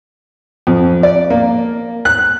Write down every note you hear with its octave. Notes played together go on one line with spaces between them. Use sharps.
F2
D5
A#3
F#6